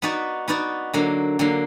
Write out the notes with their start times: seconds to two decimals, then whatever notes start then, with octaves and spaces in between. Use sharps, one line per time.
0.02 B3 D#4 F#4 B4 D5
0.48 B3 D#4 F#4 B4 D5
0.94 D3 F#3 A#3
1.39 D3 F#3 A#3